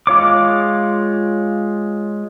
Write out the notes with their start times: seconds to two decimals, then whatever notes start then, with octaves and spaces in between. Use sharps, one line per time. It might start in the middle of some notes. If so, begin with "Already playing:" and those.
0.07 G#3 F4 C#5 D6